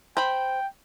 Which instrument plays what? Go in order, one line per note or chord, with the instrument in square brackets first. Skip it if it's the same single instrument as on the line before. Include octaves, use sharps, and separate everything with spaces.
[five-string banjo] C5 B5 [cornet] G5